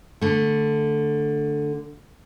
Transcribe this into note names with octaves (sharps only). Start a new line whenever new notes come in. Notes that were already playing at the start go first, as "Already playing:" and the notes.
D3 A3